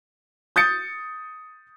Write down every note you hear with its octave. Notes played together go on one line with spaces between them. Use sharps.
D#6 G6 A6 C#7